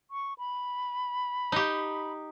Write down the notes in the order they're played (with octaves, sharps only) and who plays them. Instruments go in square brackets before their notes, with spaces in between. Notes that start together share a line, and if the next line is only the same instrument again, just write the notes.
[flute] C#6
B5
[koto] D#4 G4